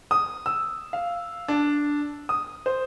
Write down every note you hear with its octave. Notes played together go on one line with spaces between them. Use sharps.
D#6
E6
F5
D4
D#6
C5